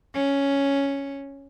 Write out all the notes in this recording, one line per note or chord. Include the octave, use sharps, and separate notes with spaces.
C#4